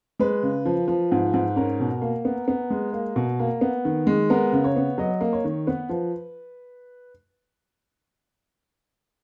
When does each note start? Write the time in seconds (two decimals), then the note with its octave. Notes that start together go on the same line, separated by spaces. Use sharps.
0.19 G#3 B4
0.43 C#3
0.66 F3
0.88 F3
1.12 G#2
1.34 G#2
1.56 C#4 A#4
1.80 B2
2.02 A#3
2.25 B3
2.48 B3
2.70 G#3
2.93 A#3
3.16 B2
3.40 A#3
3.61 B3
3.85 D#3
4.07 G#3
4.30 B3 A#4
4.53 C#3
4.64 C#5
4.76 B3
4.98 F#3 D#5
5.21 A#3
5.33 C#5
5.44 D#3
5.67 B3 B4
5.89 F3